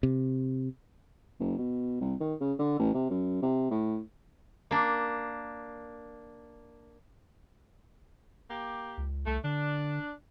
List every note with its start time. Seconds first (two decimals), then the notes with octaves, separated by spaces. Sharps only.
0.03 C3
1.40 F#1
1.58 B2
2.01 C2
2.20 D#3
2.40 C#3
2.59 D3
2.79 A1
2.94 C3
3.10 F#2
3.42 C3
3.70 A2
4.71 A#3 D4
8.49 A#3 G4
8.97 C#2
9.26 C2 A3
9.44 D3 D4